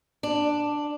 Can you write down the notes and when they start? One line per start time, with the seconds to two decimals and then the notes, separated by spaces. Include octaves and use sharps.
0.23 D4